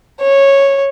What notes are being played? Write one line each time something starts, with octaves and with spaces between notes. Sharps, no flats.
C#5